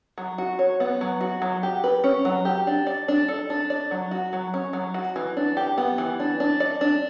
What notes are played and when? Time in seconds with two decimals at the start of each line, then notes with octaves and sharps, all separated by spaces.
0.18 F#3
0.38 F#4
0.59 C#5
0.80 B3
1.01 F#3
1.21 F#4
1.42 F#3
1.63 G4
1.84 B4
2.04 C#4
2.25 F#3
2.45 G4
2.67 D4
2.87 D5
3.08 D4
3.28 A4
3.50 D4
3.70 D5
3.91 F#3
4.11 F#4
4.33 F#3
4.54 C#4
4.73 F#3
4.94 F#4
5.16 E3
5.37 D4
5.57 G4
5.78 B3
5.98 E3
6.20 D4
6.40 D4
6.60 D5
6.81 D4